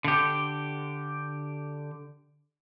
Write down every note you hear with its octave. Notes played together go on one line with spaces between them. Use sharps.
D3 G4